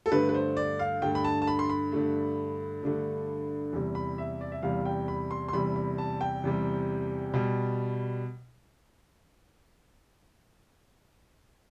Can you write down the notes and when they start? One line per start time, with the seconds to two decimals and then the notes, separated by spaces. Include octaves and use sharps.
0.06 A4
0.11 G2 D3 A3 B4
0.29 B4
0.34 C5
0.57 D5
0.79 F5
1.02 G2 D3 A3 G5
1.15 B5
1.24 A5
1.42 A5
1.47 B5
1.59 C6
1.69 B5
1.92 G2 D3 A3
2.83 G2 D3 A3
3.73 E2 C3 G3
3.95 B5
4.18 E5
4.41 D5
4.52 E5
4.62 E2 C3 G3 F5
4.85 G5
5.08 B5
5.31 C6
5.48 C6
5.53 E2 C3 G3 B5
5.76 B5
5.98 A5
6.21 G5
6.44 E2 C3 G3
7.34 B2 G3